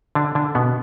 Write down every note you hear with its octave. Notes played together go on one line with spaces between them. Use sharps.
D3 D4
D3 D4
B2 B3